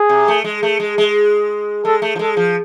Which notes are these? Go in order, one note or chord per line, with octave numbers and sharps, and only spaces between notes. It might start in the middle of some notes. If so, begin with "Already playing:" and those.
Already playing: G#4
C3
A3
G#3
A3
G#3
G#3
G#3 A4
A3
F3
G#3 A4
F3